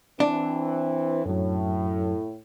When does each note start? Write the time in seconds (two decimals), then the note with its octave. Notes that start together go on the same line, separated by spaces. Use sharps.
0.20 E3 C4 D4
1.26 F#2 A2 F#3